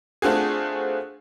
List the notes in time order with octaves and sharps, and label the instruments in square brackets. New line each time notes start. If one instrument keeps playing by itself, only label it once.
[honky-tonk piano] A3 C4 D4 F4 F#4 G#4